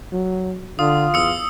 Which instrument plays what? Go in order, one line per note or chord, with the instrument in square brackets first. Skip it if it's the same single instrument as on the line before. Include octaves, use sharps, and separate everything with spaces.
[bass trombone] F#3
[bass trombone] D3 [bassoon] F4 [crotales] D#6
[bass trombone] E2 [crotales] D#6 E6 C#7